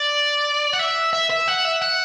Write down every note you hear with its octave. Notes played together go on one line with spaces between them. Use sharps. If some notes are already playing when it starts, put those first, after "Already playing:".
Already playing: D5
F#5
E5
E5
E5
F#5
E5
F#5